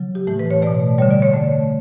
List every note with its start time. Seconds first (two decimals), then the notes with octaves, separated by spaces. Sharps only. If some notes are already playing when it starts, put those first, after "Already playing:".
Already playing: C#3 F#3
0.15 G4
0.27 A2 E3 A3
0.39 B4
0.51 C#5
0.62 B2 A3 D5
0.98 G3 C#5
1.02 D3
1.11 D5
1.22 C#5
1.34 D3 A3